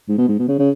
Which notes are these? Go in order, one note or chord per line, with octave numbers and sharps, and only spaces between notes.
G#2
B2
G#2
B2
C#3
C#3